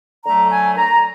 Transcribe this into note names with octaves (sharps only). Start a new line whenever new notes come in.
D3 F#3 A3 A#5
G#5
A#5